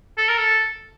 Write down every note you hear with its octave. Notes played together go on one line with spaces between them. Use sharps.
A4
A#4
A4